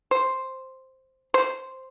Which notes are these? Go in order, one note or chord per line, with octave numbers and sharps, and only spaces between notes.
C5
C5